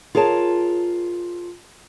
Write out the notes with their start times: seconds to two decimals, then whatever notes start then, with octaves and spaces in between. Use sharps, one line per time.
0.15 F4 G#4 A#4 C#5 A5